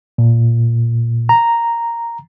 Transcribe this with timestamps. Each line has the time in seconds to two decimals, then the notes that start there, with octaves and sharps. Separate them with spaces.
0.18 A#2
1.29 A#5